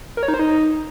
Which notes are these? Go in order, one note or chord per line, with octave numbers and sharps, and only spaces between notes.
A#4
C#5
D#4
C5
D#4